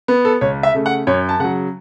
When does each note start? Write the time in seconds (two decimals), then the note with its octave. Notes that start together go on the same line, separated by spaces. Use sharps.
0.08 B3
0.25 A4
0.41 C#2 C#5
0.63 E5
0.75 C#3 A3
0.86 F#5
1.07 F#2 C#5
1.29 A5
1.39 C#3 F#3 F#5